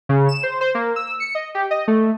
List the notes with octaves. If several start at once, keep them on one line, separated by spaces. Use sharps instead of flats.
C#3
E7
C5
C5
A#3
E6
C#7
D#5
G4
D#5
A3